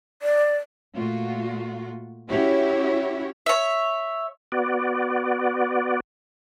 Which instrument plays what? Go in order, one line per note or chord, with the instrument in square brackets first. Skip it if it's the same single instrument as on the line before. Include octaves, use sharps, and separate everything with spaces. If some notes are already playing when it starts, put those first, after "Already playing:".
[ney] D5
[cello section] A#2 A3 F4 F#4
C#4 E4 F#4 G4 C#5
[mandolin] C#5 E5
[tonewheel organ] B3 F#4 D5